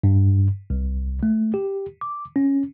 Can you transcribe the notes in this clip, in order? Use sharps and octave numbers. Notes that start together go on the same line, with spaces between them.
G2
C2
A3
G4
D6
C#4